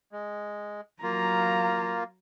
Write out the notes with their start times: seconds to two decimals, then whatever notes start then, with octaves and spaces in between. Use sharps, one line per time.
0.12 G#3
1.03 F#3 A#3 F4 A#5